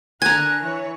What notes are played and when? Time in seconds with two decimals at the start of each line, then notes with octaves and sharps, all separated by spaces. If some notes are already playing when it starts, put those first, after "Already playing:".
0.22 D3 A#4 G#5 A#5 F#6 G#6
0.62 E3 C#5